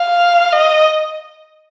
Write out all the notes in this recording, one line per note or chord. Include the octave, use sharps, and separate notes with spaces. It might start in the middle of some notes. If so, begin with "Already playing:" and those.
Already playing: F5
D#5